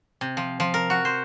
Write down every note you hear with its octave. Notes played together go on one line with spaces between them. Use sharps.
C3
F3
F3
A#4
F#4
C5